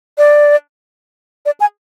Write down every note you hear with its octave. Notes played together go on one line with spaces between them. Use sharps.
D5
D5
G#5